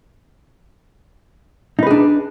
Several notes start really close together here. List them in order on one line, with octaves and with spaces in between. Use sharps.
D#4 B4 G#4 D4